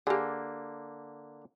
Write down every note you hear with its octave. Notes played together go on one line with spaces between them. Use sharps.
D3 A#3 G4 G#4